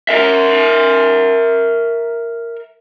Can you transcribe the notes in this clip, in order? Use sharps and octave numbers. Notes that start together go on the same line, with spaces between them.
A#4 E5